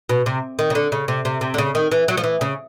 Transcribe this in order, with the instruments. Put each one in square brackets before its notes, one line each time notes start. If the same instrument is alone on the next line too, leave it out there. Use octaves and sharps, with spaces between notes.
[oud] B2
C3
D#3
C#3
D3
C#3
C3
C3
C3
D3
C#3
D#3
E3
F#3
F3
E3
C#3